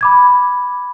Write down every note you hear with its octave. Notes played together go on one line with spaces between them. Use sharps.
B5 D6 G#6